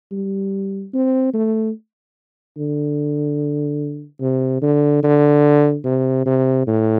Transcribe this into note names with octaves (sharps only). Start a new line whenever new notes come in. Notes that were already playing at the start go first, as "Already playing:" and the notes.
G3
C4
A3
D3
C3
D3
D3
C3
C3
A2